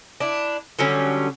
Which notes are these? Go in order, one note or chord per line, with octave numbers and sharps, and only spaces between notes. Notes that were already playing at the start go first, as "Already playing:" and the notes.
D4 E4
D3 F#3 G3 C#4